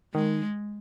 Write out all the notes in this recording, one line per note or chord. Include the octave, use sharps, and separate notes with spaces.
D#3 G#3